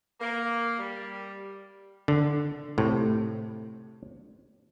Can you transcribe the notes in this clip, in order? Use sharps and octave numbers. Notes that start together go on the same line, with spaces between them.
A#3
G3
D3
A2 C3